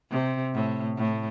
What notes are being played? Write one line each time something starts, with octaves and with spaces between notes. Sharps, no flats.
C3
A2
A2